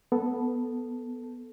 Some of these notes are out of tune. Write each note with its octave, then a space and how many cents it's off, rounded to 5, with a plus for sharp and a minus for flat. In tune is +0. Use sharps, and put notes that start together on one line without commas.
B3 +0 A4 +0